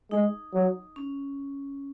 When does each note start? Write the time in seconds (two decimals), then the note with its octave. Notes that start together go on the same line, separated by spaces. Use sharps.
0.11 G#3 D#4
0.53 F#3
0.96 C#4